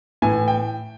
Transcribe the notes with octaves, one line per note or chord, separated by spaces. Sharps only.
A2 E3 G#5
G5